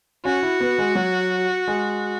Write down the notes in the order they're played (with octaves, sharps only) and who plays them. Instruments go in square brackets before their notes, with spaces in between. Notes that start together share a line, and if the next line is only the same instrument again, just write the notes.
[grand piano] C#4 [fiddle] F#4
[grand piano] E4
B3
G#3
F#3
G#3